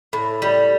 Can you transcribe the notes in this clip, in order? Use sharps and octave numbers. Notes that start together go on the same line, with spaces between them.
A2
G3